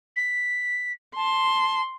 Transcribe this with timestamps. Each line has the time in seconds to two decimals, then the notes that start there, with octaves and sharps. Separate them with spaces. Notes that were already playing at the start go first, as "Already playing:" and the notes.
0.16 B6
1.16 A5 C6